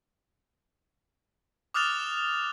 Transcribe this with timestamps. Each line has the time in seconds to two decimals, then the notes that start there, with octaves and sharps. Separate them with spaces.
1.74 D6 D#6 F6 F#6 A6 F7